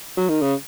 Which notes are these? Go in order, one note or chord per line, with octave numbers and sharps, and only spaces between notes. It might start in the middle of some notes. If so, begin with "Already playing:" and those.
F#3
D#3
C#3